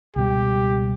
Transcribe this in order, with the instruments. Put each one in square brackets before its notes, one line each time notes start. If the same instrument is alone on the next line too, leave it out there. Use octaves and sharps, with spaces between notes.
[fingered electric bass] C#2 B2 G3 [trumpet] G4